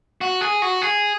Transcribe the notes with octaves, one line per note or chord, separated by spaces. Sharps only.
F#4
G#4
F#4
G#4